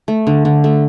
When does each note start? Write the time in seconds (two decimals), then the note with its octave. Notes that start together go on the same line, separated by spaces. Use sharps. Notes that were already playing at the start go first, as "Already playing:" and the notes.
0.08 A3
0.27 D3
0.45 D3
0.64 A3